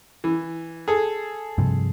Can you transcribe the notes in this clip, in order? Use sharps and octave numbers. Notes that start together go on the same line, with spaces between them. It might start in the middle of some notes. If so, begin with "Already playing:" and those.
E3
G#4 A4
G2 C3 F3